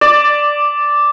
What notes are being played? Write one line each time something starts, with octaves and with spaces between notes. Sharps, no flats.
D5 D6